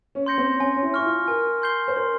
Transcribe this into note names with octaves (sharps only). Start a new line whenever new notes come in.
C#4
C6 G6 A#6 C#7
C4
C#4 G#5
C#4
E4
E4 C#6 F6
F4
A#4 G#5
C6 G6 C7 G7
C5
A#4 C6